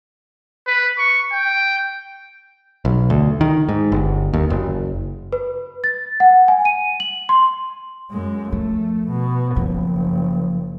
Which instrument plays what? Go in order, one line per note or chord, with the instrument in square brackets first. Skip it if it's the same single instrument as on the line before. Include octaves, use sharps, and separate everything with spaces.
[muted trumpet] B4
C#6
G5
[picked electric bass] B1
D2
D#3
G#2
G1
D#2
F#1
[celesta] B4
A6
F#5
G#5
D#7
F#7
C6
[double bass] F#2 G#3
[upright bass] F3 [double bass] A3
[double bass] B2
[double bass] F#1 [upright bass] F3